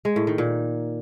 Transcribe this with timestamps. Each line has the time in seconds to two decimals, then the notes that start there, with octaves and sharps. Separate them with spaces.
0.05 G#3
0.16 A2
0.27 D#3
0.38 A#2